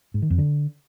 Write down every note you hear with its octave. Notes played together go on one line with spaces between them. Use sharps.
G#2
D#3
F2
D3